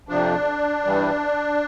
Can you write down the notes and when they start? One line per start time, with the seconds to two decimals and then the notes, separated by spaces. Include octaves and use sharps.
0.09 F2 C3 F3 D4
0.84 G2 E3 G3